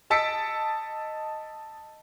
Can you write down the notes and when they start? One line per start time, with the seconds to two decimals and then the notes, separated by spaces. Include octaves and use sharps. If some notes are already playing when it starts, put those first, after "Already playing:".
0.10 D#5 A5 E6 B6 C#7 D7